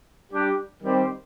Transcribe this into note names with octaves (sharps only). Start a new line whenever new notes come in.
G3 D4 G4
D#3 G3 C4 G4 C5